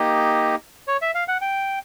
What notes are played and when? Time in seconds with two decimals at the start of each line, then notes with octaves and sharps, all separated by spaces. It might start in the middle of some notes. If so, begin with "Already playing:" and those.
Already playing: A#3 D#4 G4 D#5
0.88 C#5
1.02 E5
1.15 F5
1.28 F#5
1.41 G5